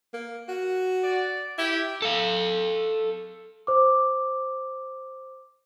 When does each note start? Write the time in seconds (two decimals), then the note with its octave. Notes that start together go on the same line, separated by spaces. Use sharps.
0.13 A#3
0.48 F#4
1.03 D5
1.58 E4 G4
2.02 A4 F5
3.67 C5 D6